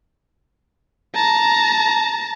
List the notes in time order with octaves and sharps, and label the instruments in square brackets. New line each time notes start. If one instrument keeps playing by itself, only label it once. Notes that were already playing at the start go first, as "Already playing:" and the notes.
[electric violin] A5 A#5